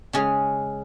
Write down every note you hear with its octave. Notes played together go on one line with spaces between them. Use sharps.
C#3 G#3 C#4 G#4